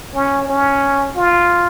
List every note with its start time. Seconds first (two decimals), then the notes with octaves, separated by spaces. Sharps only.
0.15 C#4
0.48 C#4
1.16 F4